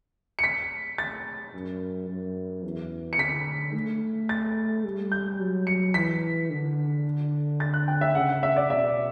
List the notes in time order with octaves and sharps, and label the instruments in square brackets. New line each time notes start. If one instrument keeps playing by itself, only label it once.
[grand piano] C#7
B6
A6
[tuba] F#2
F#2
E2
[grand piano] C#7
[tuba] D3 [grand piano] B6
[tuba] A3
[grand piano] A6
[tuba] G3
[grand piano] G6
[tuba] F#3
[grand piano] C#7
[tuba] E3 [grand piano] B6
[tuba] D3
[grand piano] A6
F#6
G5
E5
[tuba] C#3 [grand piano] F#5
[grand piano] F#5
E5
D5
[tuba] B2 [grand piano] E5